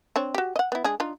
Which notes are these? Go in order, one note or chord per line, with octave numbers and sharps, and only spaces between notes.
C4 D4 C#5
F#4 G4
D#5 F#5
B3 E4
G#3 D4 G#4
D4 D#4 F4